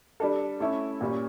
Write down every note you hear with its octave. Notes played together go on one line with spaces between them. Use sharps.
G3 D4 A4
A3 C#4 E4
A#2 G3 C#4